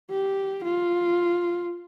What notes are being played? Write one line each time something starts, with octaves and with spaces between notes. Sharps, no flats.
G4
F4